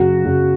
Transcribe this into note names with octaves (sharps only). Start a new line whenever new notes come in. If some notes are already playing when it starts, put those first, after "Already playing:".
Already playing: F#2 C#3 F#3 F#4
F#2 C#3 F#3